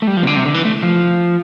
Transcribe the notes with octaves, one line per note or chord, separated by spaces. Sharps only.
A3
G3
F3
C3
D3
C3
D3
E3
A3
F3